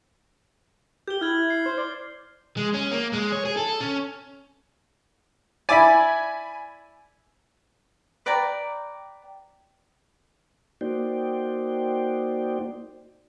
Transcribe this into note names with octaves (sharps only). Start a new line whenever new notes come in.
G4 G6 G7
E4 F6 G#6 F#7
C7
C5
D5 C7
G#3
C#4
A#3
G#3
C#5
G#4
A4
C#4
E4 D5 G#5 B5
B4 D5 G5 A#5
A#3 D#4 F#4 C5 D5 G5